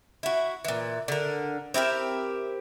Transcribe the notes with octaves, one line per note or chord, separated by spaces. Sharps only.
E4 F#4
A#2 E3
D3 A#4
C4 E4 G4 A#4